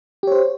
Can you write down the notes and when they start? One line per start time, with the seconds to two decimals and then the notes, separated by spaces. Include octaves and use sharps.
0.23 G4
0.27 C#5
0.32 C5